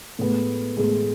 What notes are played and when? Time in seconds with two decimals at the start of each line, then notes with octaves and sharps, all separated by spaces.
0.19 A2 G#3 B3
0.77 A2 G#3 B3